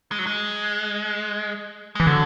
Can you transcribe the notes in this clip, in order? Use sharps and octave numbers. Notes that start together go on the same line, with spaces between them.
G#3
F#3
G#3
E3 G#3
D3 F#3